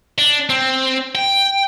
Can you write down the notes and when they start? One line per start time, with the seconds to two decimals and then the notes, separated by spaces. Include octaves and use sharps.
0.18 D4
0.50 C4
1.15 G5